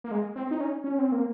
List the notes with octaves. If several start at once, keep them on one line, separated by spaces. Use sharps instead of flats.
A#3
G#3
C4
D#4
C#4
C#4
C4
A#3